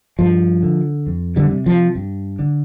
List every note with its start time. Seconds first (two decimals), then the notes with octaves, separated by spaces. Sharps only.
0.19 G2 F3
0.63 D3
1.07 F2
1.36 D3 G3
1.51 C3
1.66 F3
1.95 G2
2.39 D3